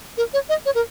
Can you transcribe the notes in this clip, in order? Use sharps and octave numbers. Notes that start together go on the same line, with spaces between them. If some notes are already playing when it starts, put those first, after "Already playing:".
A#4
C#5
D#5
C#5
A#4